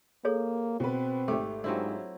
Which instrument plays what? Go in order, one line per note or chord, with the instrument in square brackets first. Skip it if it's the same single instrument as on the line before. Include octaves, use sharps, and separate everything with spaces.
[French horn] A#3 [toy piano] G#4 A4 C#5
[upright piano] B2 B4 [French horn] C4
[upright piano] G#1 G4 D6 [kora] A3
[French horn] G#2 [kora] F#3 C4 E4 [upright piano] D4 F4 G4